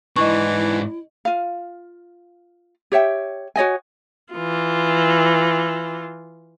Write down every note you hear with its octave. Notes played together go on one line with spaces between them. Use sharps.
G#2 E3 D4 E4 D#5 C#6
F4 F5
G4 C#5 E5 G5
F#4 C#5 D#5 G#5
E3 F4